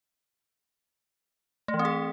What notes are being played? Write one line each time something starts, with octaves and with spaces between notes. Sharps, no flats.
A3
E3
C4
G#4